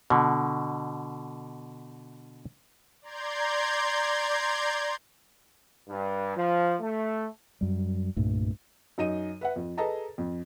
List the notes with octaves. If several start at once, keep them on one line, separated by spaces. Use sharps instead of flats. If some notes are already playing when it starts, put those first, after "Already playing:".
B2 D3
D5 A#5 C6 G6 G#6
G2
F3
A3
F#2 G3
C2 G2 A#2 A3
F#2 D#4 D#5 D#7
B4 E5 F#5
F2
G#4 A4 B4 D#5 A5 A#5
F2